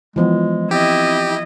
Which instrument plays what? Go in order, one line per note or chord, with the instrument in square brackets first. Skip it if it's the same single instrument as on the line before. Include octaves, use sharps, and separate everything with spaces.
[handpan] E3 F3 B3 [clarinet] G#3
[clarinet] C4 [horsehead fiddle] E4 D#5 [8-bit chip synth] G4